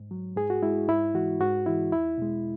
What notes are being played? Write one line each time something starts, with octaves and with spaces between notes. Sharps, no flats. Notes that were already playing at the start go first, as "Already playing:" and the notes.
Already playing: G#2
F#3
G#2 G#4
F#4
G#3 E4
G#2 E4
E3 G#3 F#4
G#2 F#4
E3 G#3 E4
E2 E4
B2 G#3